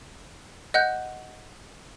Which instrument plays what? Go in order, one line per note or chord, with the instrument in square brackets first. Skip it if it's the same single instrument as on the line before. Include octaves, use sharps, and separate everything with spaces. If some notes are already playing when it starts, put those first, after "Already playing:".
[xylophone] D#5 F#5 F#6 G6